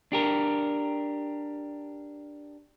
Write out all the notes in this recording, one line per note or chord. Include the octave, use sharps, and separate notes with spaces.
D4 G4 A#4